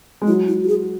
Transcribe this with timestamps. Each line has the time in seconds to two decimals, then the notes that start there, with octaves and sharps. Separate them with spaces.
0.22 G#3
0.27 F#3 E4
0.48 E4
0.64 F#4
0.68 G#4